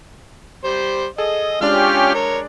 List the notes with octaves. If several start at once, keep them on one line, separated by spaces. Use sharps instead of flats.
G3 C5
G#4 A4 D#5
G#3 C#4 D4 F4 G4 D5 F6
A#4 C#5